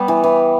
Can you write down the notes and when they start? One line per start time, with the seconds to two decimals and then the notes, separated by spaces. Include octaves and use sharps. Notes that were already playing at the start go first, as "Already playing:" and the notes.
Already playing: G3 B3
0.08 E3
0.24 E3